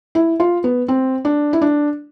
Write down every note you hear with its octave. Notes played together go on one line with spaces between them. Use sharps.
E4
F4
B3
C4
D4
E4
D4